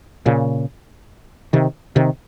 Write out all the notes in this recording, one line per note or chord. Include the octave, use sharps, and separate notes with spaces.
A#2 C#3
C3 D#3
C3 D#3